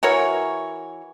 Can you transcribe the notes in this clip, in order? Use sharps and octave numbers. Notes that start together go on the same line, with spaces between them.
E3 F#4 A#4 C#5